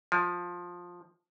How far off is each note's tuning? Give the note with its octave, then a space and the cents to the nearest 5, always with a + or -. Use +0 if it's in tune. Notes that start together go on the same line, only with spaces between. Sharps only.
F3 +15